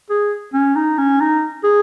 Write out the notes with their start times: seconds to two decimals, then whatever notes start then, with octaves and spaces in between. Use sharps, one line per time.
0.10 G#4
0.54 C#4
0.76 D#4
0.98 C#4
1.21 D#4
1.64 G#4